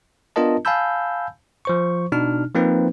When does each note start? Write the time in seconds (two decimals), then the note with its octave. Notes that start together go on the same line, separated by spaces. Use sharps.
0.36 B3 D4 F4 A#4 D#5 A5
0.65 F5 G#5 A5 B5 E6 G6
1.65 F3 C5 C#6
2.12 B2 D4 D#4 F6
2.55 F3 A#3 C4 D#4 B4